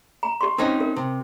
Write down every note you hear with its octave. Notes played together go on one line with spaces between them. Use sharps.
A#5
G4 C6
C4 C#4 D#4
A#4
C3